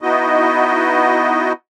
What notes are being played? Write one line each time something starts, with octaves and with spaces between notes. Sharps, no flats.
B3 D#4 E4 F#4 D#5